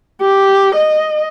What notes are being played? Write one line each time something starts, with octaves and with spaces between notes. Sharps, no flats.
G4
D#5